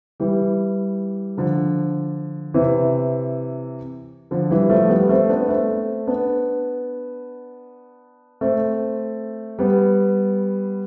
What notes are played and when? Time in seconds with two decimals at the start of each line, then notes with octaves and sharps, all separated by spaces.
0.20 E3 G3
1.37 D3 F3
2.54 C3 E3
4.31 D3 F3
4.50 E3 G3
4.70 F3 A3
4.89 G3 B3
5.09 A3 C4
5.29 B3 D4
5.48 A3 C4
6.07 B3 D4
8.41 A3 C4
9.59 G3 B3